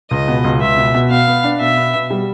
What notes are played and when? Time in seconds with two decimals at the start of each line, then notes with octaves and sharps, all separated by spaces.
0.11 C#2 D#5
0.28 B2
0.44 C#2
0.61 C#2 E5
0.77 B2
0.94 B2
1.10 B3 F5
1.28 B3
1.44 D4
1.60 B2 E5
1.77 B3
1.94 B2
2.11 G3